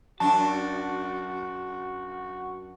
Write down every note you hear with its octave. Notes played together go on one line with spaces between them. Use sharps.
F#2 D4 F#4 A5